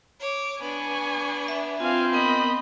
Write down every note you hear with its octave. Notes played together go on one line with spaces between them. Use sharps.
C#5 D6
B3 D4 G#5 C#6
E5
C4 F4 F5 G#5
B3 A#4 D#5 B5